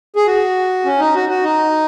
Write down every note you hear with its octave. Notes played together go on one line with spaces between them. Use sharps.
G#4
F#4
C#4
D#4
F#4
F#4
D#4